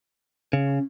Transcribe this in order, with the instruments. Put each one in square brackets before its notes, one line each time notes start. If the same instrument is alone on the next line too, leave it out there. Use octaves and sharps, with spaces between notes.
[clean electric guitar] C#3 [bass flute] C#4